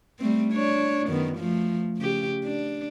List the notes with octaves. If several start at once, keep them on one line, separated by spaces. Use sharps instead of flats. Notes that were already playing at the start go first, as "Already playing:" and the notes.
G3 A3 C4
D4 C#5
F#2 D#3 B3
F3 A3
C#3 G4
D4